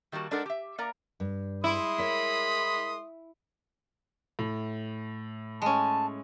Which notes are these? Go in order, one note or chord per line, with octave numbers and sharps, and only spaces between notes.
D#3 G3 A#3 F#4 A5
G#3 D4 D#4 A4 A#4 F#5
G4 E5
A#3 A#4 D5 A#5
G2
G#3 E4 C6 D#6
A#4 C#5 B5
A2
G#3 C#4 A5